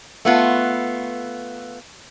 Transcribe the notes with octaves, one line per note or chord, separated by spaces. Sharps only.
A3 B3 F4